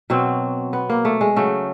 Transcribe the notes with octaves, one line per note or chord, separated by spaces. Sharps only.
B2 F#3 C4
B3
A#3
A3
G#3
C#3 F#3 A3